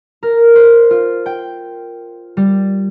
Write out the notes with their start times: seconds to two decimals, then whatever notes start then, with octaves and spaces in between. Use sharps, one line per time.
0.23 A#4
0.56 C5
0.91 F4
1.26 G5
2.37 G3